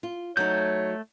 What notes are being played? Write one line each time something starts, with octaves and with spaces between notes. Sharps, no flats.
F4
F#3 A3 D#4 C#5 G6